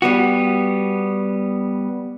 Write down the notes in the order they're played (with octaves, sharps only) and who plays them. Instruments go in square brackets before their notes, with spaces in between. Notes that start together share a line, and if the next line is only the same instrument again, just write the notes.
[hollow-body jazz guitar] G3 B3 F#4